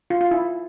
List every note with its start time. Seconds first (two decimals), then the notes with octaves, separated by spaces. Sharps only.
0.10 F4
0.21 F4
0.31 E4